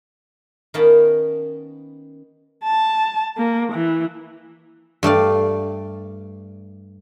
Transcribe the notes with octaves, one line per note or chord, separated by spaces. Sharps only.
D#3 A#3 B3 C#4 A5 B5
A5
A#3
E3
G2 A3 D5 F5